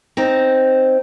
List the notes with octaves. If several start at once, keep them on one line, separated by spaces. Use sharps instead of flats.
C4 D#4